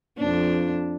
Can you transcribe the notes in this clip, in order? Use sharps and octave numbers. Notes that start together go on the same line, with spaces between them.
F2 D4